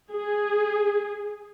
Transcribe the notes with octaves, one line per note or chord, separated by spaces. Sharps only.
G#4